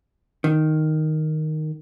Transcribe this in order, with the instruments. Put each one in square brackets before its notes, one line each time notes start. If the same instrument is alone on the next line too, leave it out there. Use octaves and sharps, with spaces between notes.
[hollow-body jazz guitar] D#3